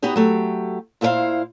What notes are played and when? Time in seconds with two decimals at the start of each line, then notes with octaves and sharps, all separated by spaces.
0.02 B3 D#4 F#4 G4 D#5
0.16 F#3 A3 G4
1.01 A#2 E4 G#4 B4 C5 F5